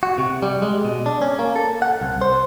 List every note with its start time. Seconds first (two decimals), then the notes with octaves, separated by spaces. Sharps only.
0.03 F#4
0.18 C3
0.43 G3
0.62 G#3
0.85 B2
1.06 D4
1.22 C#4
1.39 A#3
1.56 A4
1.82 F#5
2.01 C2
2.21 C5